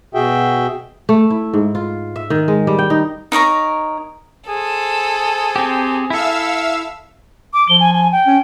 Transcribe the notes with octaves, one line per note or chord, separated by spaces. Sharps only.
B2 F#4 G#4 E5 G5
A3
E4
G#2
F4
E5
D#3
G#3
G3
G5
D#4
D#4 A#4 C#5 A#5
G#4 A4 C5
C4 G4
E4 A4 E5 F5 E6
D6
F3 G7
G#5
G#5
G5
C#4